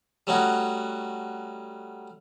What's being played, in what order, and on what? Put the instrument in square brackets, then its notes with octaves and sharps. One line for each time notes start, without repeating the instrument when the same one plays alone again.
[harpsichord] G3 A3 C#4 D#4 F#4 F#5